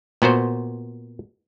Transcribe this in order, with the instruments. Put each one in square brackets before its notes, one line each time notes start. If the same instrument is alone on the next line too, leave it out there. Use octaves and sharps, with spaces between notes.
[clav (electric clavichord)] A#2 B3 F#4 C5